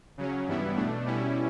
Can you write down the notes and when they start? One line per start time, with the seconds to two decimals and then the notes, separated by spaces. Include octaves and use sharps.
0.18 C#3 F#3 C#4
0.47 G2 E3 G3 B3 E4
0.77 B2 A3 D4
1.05 B2 G3 C#4 E4